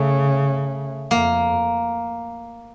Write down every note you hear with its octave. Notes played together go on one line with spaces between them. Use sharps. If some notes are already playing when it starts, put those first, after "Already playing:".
Already playing: C#3 A3
F2 A#3